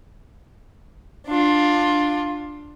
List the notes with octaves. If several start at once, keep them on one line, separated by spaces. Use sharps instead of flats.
D4 F4